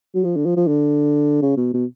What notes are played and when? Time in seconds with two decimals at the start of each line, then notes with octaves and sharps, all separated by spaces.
0.14 F#3
0.24 F3
0.36 D3
0.46 F3
0.56 F3
0.67 D3
1.42 C#3
1.57 B2
1.74 B2